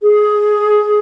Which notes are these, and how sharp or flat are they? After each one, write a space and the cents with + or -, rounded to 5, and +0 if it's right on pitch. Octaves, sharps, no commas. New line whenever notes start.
G#4 +10